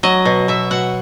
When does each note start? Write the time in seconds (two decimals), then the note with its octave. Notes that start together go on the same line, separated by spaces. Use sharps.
0.03 F#3 D#5
0.25 B2
0.48 B2 E5
0.71 B2 F#5